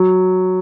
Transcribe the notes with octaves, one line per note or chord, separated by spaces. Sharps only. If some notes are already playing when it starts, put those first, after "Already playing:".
Already playing: F#3